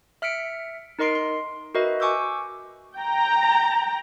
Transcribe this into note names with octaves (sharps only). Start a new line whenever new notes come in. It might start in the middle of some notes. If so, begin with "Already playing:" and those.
E5 F6 B6 C#7 D7
D#4 A#4 D#5 C6 C7 D7
C6
F#4 A#4 B4 D#5 E5
G#5 C#6 D6 E6 G6
G5 A#5